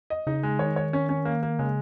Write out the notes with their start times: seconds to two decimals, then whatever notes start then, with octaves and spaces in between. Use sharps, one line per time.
0.10 D#5
0.27 C#3 D#4
0.43 G#3
0.59 D#3 C#5
0.76 C#5
0.93 C#4
1.09 C#4
1.25 A#3
1.43 A#3
1.59 C#3 G#3